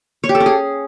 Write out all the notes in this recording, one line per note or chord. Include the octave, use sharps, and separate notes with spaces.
C#5
G4
A4
C#4
G#4